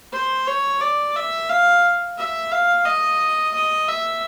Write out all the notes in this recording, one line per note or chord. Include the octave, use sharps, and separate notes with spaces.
C5
C#5
D5
E5
F5
E5
F5
D#5
D#5
E5